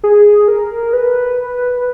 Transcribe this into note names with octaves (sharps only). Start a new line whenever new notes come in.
G#4
A#4
B4